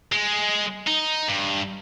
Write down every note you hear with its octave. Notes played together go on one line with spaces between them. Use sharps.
G#3
D#4
G2